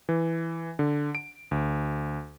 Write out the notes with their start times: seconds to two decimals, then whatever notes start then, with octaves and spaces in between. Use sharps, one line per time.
0.09 E3
0.79 D3
1.15 D7
1.51 D2